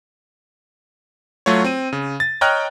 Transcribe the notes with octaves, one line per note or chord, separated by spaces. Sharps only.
F#3 A3 F4 F#4 C#5
C4 D#7
C#3
A6
C#5 D#5 G5 A#5 F6 F#6